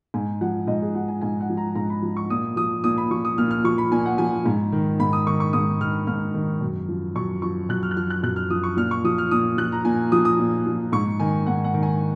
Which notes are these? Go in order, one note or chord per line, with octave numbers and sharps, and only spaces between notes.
G#2 G#5
F3 F#5
G#2 D#5
G#4
F3 F#5
G#5
G#2 G#5
F#5
F3
A#5
G#2 A#5
B5
F3
C#6
A#2 D#6
F3 D#6
A#2 D#6
B5
F3 C#6
D#6
A#2 F6
F6
F3 C#6
B5
A#2 G#5
F#5
F3 G#5
G#2
D#3
G#2 B5
D#6
D#3 C#6
C#6
G#2 D#6
D#3 F6
G#2 F6
D#3
F#2
F3
F#2 C#6
F3 C#6
F#2 F#6
F6
F#6
F3 F6
F#6
F#2 F#6
F6
F3 D#6
C#6
A#2 F6
C#6
F3 D#6
F6
A#2 D#6
F3 F#6
A#5
A#2 G#5
F3 D#6
D#6
A#2
F3
G#2 C#6
D#3 G#5
G#2 F#5
F#5
D#3
G#5